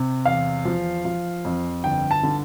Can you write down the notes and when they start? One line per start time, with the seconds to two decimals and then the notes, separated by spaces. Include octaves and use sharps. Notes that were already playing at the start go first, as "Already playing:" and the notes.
Already playing: C3
0.26 E2 F5
0.65 F3
1.05 F3
1.45 F2
1.84 G1 G5
2.11 A5
2.23 D3